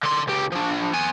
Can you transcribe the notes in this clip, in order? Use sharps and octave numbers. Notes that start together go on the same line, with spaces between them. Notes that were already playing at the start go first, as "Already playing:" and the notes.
D3 C6
C#2 G4
F3 D4
B3 G#5